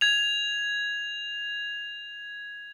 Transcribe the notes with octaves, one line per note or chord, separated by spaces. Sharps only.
G#6 F7